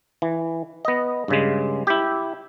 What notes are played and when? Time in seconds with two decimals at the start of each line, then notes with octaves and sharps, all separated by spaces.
0.22 E3
0.85 B3 D#5
1.28 G2 C#3 G#3
1.87 E4 G4